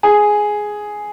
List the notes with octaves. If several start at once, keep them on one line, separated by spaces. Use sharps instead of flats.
G#4